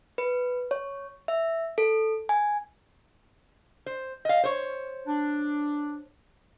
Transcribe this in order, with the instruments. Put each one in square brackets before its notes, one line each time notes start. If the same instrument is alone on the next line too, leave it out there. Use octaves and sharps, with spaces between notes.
[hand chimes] B4
C#5
E5
A4
G#5
[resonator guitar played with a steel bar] C5
D#5 F5
C5 C#5
[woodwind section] D4